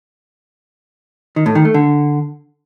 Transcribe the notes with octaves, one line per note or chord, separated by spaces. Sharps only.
D#3
A2
D#3
A3
D3